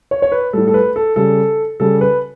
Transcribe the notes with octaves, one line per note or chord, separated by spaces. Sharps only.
C#5
C#5
B4
A2 G3 A4
A4
B4
A4
C#3 G3 A4
C#3 G3 A4
B4